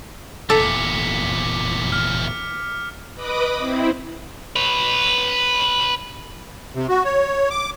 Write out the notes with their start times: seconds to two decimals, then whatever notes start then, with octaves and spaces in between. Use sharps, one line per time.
0.50 F1 E2 A#2 A4 D6 B6 C#7
1.92 F6
3.15 B4 D#5 B5 D6 D#6
3.58 C4 E4
4.56 B4 C#5
6.75 C3
6.89 F#4
7.05 C#5
7.50 D6